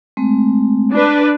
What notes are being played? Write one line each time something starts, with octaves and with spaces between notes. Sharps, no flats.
G#3 A3 C4
D4 B4